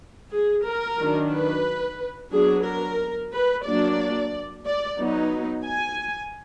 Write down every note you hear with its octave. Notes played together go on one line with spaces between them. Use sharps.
G#4
A#4
D#3 F#3 D4
B4
F#3 B3 D4 G#4
A#4
B4
F#3 A#3 D4 D5
D5
F#3 B3 D#4
G#5